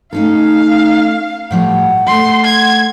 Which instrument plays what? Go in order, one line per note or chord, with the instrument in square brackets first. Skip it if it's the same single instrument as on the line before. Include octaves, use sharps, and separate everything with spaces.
[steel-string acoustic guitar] A3 C#4 A4 [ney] D#4 [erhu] F5
[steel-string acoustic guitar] A2 F3 G3 [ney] F#5
[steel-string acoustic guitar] A3 A4 [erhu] C6
[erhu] G#6